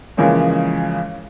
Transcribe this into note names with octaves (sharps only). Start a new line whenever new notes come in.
C#3 E3 F3 G#3 A#3 C#4